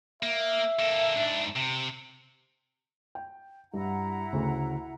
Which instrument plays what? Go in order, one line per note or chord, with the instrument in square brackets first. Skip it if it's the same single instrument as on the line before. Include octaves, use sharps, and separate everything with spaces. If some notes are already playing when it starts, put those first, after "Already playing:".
[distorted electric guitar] A#3 [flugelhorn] E5
[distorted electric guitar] A#3 A4
G#2 D4
C3
[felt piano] G5
[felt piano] G2 [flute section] E4 F#5 A#5
[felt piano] D2 [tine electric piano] C#3 A3